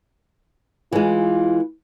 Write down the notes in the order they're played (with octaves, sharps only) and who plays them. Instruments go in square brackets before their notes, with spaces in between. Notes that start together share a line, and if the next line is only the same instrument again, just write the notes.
[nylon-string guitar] E3 G#3 [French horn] F4